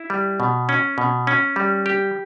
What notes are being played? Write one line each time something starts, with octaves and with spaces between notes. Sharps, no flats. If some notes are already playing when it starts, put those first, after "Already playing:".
Already playing: E4
G3
B2
C#4
B2
C#4
G3
G4